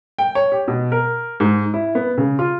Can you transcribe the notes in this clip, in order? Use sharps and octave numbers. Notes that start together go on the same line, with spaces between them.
G5
C#5
G4
B2
A#4
G#2
E4
B3
C#3
F4